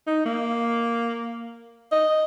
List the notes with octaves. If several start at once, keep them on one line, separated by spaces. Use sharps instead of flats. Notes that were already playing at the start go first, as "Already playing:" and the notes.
D#4
A#3
D#5